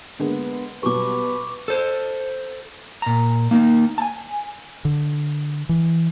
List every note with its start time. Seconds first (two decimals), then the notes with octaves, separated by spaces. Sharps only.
0.19 D3 G#3 A#3 B3
0.83 B2 F#3 G3 B4 C#6 D6
1.68 A4 C5
3.02 A#2 A#5
3.51 A#3 D#4
3.98 G#5 A5
4.85 D3
5.69 E3